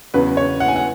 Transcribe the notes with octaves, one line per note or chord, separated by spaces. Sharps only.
E2 C#3 F#3 C#4 B4
C#5
F#5
G#5
F#5